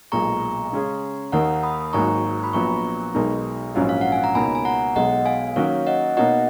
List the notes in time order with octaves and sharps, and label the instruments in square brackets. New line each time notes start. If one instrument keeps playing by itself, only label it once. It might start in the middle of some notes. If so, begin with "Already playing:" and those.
[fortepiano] B1 A#2 G#3 [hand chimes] A#5 C#6
[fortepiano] C#3 G#3 C#4 G#4
[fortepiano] D#2 D#3 A#3 [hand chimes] F#5 A#5
[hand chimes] B5 D#6
[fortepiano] G#1 G#2 F#3 A#3 D#4 [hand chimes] A#5 C#6
[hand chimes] B5
[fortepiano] A#1 A#2 F#3 B3 [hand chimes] A#5 C#6
[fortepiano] B1 B2 G#3 D#4 A#4
A#1 G#2 F#3 C#4 F4
[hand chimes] F5
F#5
G#5
A#5
[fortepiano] C#2 B2 A#3 D#4 [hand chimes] G#5 B5
[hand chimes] G#5
F#5 A#5
[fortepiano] B1 B2 G#3 [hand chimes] D#5 F#5
[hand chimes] F5 G#5
[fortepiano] D#3 F#3 A#3 C#4 F#4 [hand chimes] C#5 F5
[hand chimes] D#5 F#5
[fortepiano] B2 A#3 D#4 F#4 C#5 [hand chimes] D#5 F#5